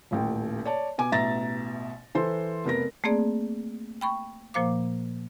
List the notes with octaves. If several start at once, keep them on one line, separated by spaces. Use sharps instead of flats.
D#1 A1 G5
C#5 D5 A5
B2 G#5 D6
A1 B2 E5 A#5 A6 A#6
E3 A4 C5 C6
F1 B3 A#4 A#6
A3 A#3 C4 G#4 D5
G5 B5 C#6
A#2 F3 A#3 C5 F5 D6